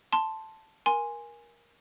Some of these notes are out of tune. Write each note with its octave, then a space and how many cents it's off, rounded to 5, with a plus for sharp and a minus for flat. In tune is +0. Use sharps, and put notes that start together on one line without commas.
A5 +0 C6 +0
A#4 +15 G#5 -5 C6 +0